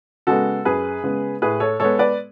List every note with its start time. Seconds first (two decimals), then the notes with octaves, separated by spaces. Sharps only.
0.27 C#3 G#3 B3 F#4 A4
0.65 F#2 G#4 B4
1.03 C#3 G#3 B3
1.42 A2 G#4 B4
1.60 A4 C#5
1.80 G#3 B3 A4 C#5
1.99 B4 D5